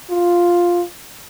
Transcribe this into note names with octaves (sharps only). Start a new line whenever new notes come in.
F4